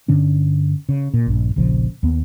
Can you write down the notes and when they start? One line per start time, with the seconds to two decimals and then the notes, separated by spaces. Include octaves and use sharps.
0.08 G2 D3 C#4 D4
0.89 C#3
1.14 A#2
1.27 A#1 G2
1.56 D#1 A#1 C#3 F3
2.03 D#2 B3